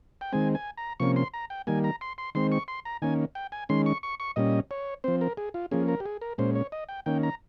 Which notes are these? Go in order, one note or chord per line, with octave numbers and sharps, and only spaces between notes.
G5
D#3 G#3 C4 G#5
G#5
A#5
C3 F3 A#3 C#4 C#6
C6
A#5
G5
D#3 G3 A#3 G#5
A#5
C6
C6
D#3 G#3 C4 C6
C#6
C6
A#5
D#3 A#3 C#4 G#5
G5
G#5
D#3 G#3 C#4 C6
C#6
C#6
C#6
A#2 G3 C#4 D#5
C#5
F3 C4 C5
A#4
G#4
F4
F3 A#3 C#4 G#4
A#4
G4
G#4
A#4
A#2 G#3 C#4 C5
C#5
D#5
G5
D#3 A#3 C#4 G5
A#5